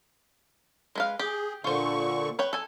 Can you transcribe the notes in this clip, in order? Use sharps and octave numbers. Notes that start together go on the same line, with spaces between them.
G#3 B4 F5
G4 G#4
A#2 D3 F4 C5 C#6
B4 C#5 G5
A4 G#5